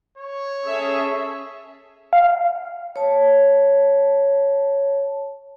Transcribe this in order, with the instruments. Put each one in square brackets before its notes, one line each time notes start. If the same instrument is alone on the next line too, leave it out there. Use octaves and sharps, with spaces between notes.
[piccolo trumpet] C#5
[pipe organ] C#4 G#4 [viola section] A4 E5
[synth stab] F5
[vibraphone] C#5 A5